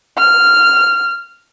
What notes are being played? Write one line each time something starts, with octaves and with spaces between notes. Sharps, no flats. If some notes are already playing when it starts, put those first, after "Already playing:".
F6